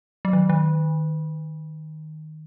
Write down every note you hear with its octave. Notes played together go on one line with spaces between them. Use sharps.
F#3
D#3
D#3